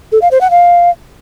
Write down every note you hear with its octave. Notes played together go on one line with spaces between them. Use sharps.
A4
F5
C5
F#5
F5